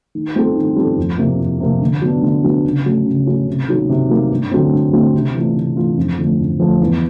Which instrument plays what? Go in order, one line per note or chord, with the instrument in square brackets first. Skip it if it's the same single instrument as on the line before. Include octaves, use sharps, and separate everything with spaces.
[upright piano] D#3
G3 C4 F4 A4
D#3
G3 C4 F4 A4
F2
C3 F3 A#3
F2
C3 F3 A#3
D3
F#3 B3 D4
D3
F#3 B3 D4
C#3
F#3 A3 C#4
C#3
F#3 A3 C#4
C3
D#3 F#3 A#3
C3
D#3 F#3 A#3
G2
D3 F#3 A3 C4
G2
D3 F#3 A3 C4
C3
E3 A3 D4 F4
C3
E3 A3 D4 F4
F2
D3 F3 A3
F2
D3 F3 A3
E2